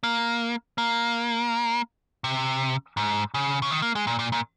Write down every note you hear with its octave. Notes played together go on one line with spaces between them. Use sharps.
A#3
A#3
C3
G#2
C#3
C#3
D#3
A#3
G#3
A#2
A#2
A#2